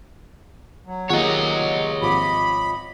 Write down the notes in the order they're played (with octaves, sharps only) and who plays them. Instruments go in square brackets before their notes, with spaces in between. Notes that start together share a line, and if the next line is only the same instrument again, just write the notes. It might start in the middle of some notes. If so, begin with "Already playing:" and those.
[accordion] F#3
[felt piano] D#3 A#3 G4 [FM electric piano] F4 G#4 F#5 [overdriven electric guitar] C#5 D#5
[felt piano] G#1 F3 D6 [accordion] B5